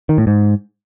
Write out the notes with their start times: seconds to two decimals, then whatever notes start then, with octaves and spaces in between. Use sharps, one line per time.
0.09 D#3
0.18 A2
0.27 G#2